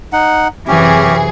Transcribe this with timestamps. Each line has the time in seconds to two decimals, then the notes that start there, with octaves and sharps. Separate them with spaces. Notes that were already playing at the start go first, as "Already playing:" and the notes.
0.13 D#4 F#5
0.68 F#2 C3 E3 C#4 G4 G#4